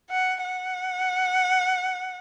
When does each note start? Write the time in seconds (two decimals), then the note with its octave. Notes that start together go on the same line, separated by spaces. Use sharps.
0.10 F#5
0.44 F#5